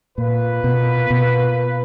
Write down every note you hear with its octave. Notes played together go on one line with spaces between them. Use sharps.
A#2 A#3 F4 B4
B2
B2